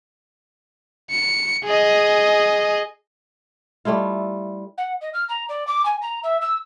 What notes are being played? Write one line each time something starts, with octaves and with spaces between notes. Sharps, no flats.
C#7
G#4 D#5
G3 A3 E4 F4
F#5
D#5
F6
A#5
D5
D6
G#5
A#5
E5
E6